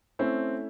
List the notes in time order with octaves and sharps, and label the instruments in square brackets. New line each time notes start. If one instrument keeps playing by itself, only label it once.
[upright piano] A3 C#4 E4 [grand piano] C4